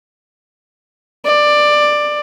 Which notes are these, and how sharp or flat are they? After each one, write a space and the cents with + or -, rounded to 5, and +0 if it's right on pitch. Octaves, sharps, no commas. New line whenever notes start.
D5 +15